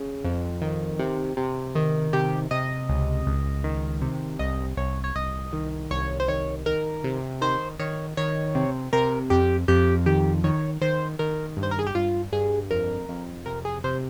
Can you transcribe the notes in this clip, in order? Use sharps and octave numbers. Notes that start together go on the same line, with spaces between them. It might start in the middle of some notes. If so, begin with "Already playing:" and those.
Already playing: C#3
F2
D#3
C3
C3
D#3
C3 G4
C3 D#5
C#2
C#2
D#3
C3
C2 D#5
C2 C#5
C#5
C2 D#5
D#3
C2 C#5
C5
D#3 C#5
D#3 A#4
C3
D#3 C5
D#3 C#5
D#3 C#5
C3
C3 A#4
F2 G4
F2 G4
D#3 G4
D#3 C#5
D#3 C5
D#3 A#4
G2
C5
A#4
G#4
G4
G2 F4
G2 G#4
F2 A#4
F2
C3 A#4
G#4
C3 C5